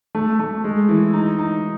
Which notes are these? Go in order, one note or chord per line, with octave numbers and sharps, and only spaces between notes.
A3
A3
G#3
E3
D#4
D#4